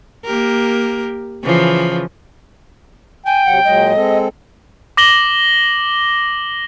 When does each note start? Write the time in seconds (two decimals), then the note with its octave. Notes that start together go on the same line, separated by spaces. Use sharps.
0.25 A#3 G4 A#4
1.43 C#3 E3 F3
3.26 G5 G#5
3.45 C3 F#3 F#5
3.65 A#2 F#3 G#3 D#5
3.94 G#3 C4 A4
4.97 D6 A#6 F#7 G7